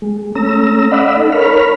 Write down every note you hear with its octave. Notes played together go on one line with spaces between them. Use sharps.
G#3
A3 C#4 A#5 E6
D5 D#5 F5 F#5 B5 E6
D#4 A4
A#4 C#5 B5 F6